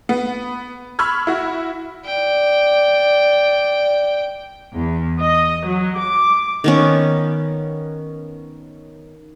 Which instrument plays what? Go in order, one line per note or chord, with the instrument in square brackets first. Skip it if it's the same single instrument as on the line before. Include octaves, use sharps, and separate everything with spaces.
[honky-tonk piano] B3
B5 C#6 E6 F6 G#6
E4 F#4
[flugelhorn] D5 [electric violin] G5
[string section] E2
D#5
F#3
D6
[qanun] D#3 B3 C#4